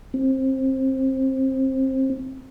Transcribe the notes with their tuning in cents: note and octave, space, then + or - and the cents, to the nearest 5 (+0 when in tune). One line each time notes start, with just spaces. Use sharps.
C4 +20